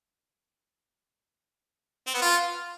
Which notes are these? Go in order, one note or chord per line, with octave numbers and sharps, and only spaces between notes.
C4
B3
F4